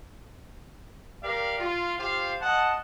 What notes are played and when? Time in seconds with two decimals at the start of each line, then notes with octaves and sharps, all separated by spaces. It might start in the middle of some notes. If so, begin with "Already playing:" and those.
1.23 G4 A#4 D5 F5
1.59 F4
1.99 F4 G4 C5 F5
2.41 D#5 F#5 A5